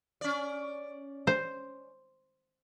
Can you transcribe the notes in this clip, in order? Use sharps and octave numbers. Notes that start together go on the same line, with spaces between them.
C#4 D5
C5